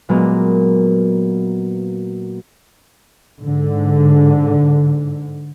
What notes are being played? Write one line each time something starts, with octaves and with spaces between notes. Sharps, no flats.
A#2 F#3 G#3 A#3 B3
G#2 D3